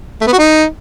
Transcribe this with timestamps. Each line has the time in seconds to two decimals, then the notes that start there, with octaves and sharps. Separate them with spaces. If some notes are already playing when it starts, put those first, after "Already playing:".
0.21 A3
0.27 B3
0.33 F#4
0.38 D#4